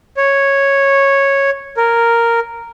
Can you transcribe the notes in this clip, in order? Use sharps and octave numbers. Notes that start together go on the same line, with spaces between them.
C#5
A#4